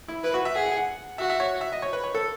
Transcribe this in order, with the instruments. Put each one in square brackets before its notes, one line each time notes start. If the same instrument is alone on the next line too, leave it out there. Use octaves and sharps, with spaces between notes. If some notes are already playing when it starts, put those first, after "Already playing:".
[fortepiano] E4
[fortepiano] E4 [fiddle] B4
[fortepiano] F#4
E5
[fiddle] G#4 [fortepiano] F#5
[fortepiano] F#5
F#5
[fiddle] F#4 [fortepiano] E5
[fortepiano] E5
C#5
E5
D#5
C#5
B4
C#5
A4